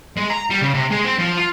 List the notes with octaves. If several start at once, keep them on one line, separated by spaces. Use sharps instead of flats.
G#3
A#5
G3
C#3
C3
G#3
C4
F3
F4